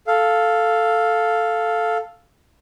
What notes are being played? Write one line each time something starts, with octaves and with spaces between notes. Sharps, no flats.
A4 F5